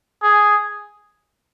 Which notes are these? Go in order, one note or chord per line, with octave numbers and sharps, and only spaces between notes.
G#4